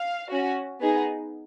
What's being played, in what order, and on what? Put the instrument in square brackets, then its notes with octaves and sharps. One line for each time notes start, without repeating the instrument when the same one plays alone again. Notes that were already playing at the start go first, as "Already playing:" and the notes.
Already playing: [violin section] F5
C#4 F#4
B3 D#4 G#4